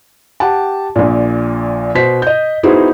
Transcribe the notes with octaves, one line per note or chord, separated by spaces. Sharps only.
G4 F#5 A5
A#1 A#2
B2 C5 B6
D#5 G6
B3 D#4 E4 F#4 G#4 C5